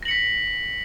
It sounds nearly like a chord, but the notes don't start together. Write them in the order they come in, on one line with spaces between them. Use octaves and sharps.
A#6 F#7 C#7 B6